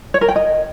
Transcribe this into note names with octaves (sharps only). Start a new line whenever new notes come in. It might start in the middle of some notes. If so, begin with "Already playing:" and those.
C#5
A#4
G5
D#5